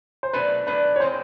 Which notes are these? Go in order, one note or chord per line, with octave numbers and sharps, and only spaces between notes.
C5
B2 F#3 A3 D4 B4
B2 F#3 A3 D4 B4
C#5
A#2 F3 G#3 C4 C5